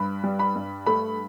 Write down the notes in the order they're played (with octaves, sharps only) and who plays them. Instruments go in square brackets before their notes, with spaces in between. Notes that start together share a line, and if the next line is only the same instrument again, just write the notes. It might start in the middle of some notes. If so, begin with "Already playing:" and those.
Already playing: [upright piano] G2 B5
G3
B5
G2
A3 B5